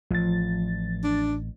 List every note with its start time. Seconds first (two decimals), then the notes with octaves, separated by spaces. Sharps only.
0.11 A1 F3 A6
1.04 D4